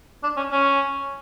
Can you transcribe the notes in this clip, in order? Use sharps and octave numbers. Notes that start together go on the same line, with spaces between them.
D4
C#4
C#4